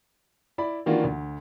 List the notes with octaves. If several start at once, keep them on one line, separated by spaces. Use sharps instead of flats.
E4 D5 B5
D#3 E3 A#3 D4 F4 F#4
D2